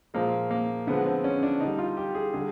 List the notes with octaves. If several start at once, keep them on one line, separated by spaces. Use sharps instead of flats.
A#2 F3 G#3 A#3
A#3
D3 F3 G#3 B3
C4
C#4
D4
D3 G3 D#4
F4
G4
G#4
D3 G3 G#4